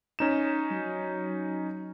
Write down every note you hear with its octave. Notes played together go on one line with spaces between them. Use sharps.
C#4 D#4 E7
F#3